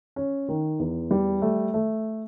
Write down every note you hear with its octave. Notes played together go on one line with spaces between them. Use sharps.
C#4
D#3
E2
G3
A3
A3